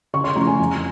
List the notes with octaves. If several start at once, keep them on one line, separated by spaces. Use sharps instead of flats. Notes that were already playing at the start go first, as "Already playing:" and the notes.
C#3 C#6
C6
F3 A3 C#4 A#5
G#5
F2